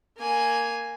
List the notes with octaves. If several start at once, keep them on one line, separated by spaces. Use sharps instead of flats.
A#3 G#5